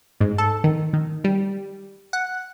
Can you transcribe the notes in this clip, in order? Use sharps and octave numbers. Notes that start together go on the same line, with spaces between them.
G#2
A4
D#3
D#3
G3
F#5